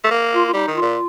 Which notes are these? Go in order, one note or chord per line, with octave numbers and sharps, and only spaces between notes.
A3
A#3
F4
F4
G3 D#4
D#3
F4
A#2